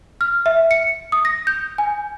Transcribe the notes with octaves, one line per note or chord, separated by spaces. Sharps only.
F6
E5
C#7
D#6
A#6
G6
G#5